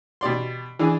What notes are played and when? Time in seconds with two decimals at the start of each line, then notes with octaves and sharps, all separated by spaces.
0.21 B2 G4 D5 C6
0.79 E3 D4 G#4